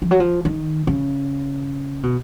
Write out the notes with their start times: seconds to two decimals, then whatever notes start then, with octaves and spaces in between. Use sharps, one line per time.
0.02 F3
0.11 F#3
0.20 F3
0.45 D#3
0.87 C#3
2.03 B2